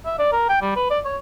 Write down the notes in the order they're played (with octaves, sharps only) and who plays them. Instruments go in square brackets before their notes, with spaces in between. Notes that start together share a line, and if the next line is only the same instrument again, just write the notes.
[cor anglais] E5
D5
A#4
G5
G3
B4
D5
C#5